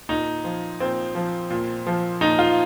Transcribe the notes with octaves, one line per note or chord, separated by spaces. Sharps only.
A#2 D#4
F3
A#2 C4
F3
A#2
F3
A#2 D#4
F4